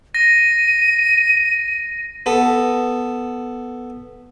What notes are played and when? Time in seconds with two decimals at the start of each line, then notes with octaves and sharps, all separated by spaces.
0.15 A#6 D#7
2.26 B3 A4